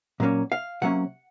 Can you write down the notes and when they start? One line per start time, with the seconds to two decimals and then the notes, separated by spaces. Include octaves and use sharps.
0.20 A#2 F#3 A#3 C#4
0.52 F5
0.82 C3 F#3 A#3 C#4 F#5